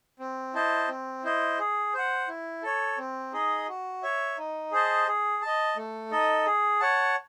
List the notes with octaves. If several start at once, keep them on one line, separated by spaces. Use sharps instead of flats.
C4
E4 C5 D#5 A5
C4
E4 C5 D#5
G#4
C5 F#5
E4
A4 C#5
C4
D#4 G#4 D#5
F#4
C#5 E5
D#4
G#4 C5 D#5 A5
G#4
D#5 A5
A3
D#4 A4 D#5
G#4
C#5 F#5 A5